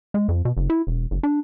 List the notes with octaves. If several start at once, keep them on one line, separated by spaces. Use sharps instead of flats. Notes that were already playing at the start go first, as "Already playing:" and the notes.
G#3
F2
B2
F#1
E4
E1
F#1
D4